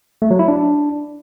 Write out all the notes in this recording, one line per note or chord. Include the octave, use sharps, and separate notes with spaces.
A3
F#3
E4
D4